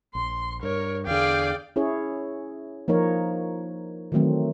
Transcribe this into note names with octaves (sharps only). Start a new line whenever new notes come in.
A#1 C6
G2 A#4 C#5
E2 D3 G#4 D5 F5 G5
C#4 E4 G#4 C#5
F3 A#3 D#4 A#4 C#5
D#3 E3 F#3 A3 C4